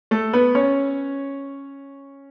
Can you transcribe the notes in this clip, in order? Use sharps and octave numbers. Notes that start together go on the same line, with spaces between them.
A3 A4
B3 B4
C#4 C#5